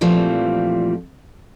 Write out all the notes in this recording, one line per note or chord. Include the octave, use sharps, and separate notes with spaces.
A#2 E3 F3 G3 A3 C4